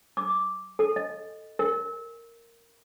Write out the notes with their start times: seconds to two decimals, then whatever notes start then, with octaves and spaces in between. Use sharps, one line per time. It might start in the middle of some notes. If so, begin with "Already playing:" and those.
0.17 D6
0.79 A4
0.96 D#5
1.59 A#4